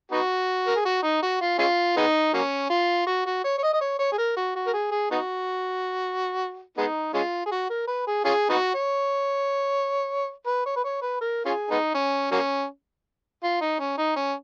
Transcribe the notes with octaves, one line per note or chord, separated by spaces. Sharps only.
B3 D#4 F#4
A#4
G#4
F#4
D#4
F#4
F4
G#3 C#4 F4
G#3 B3 D#4
F#3 A#3 C#4
F4
F#4
F#4
C#5
C#5
D#5
D#5
C#5
C#5
G#4
A#4
F#4
F#4
A#4
G#4
G#4
B3 D#4 F#4
G#3 B3 D#4
G#3 C#4 F4
G#4
F#4
A#4
B4
G#4
C#4 F4 G#4
B3 D#4 F#4
C#5
B4
C#5
B4
C#5
B4
A#4
C#4 F4 G#4
G#3 B3 D#4
C#4
F#3 A#3 C#4
F4
D#4
C#4
D#4
C#4